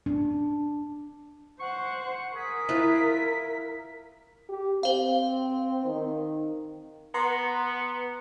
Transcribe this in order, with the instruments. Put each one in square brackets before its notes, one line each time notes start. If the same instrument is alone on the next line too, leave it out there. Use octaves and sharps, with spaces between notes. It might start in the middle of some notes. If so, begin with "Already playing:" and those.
[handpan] D4
[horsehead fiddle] C5 [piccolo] F#5 [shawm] C#6
[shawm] G#4 [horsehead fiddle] A#4 [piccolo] B6
[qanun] E4 F4 B4
[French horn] G4
[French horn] C4 [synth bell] C5 F5
[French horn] D#3
[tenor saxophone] B3 [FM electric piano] A#5 C6